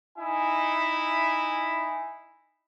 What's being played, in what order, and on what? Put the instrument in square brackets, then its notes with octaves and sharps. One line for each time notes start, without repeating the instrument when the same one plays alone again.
[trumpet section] D#4 E4 G#5